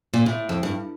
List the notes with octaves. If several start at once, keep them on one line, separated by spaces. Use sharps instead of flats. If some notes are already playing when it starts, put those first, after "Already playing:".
A#2
A2
F2
G2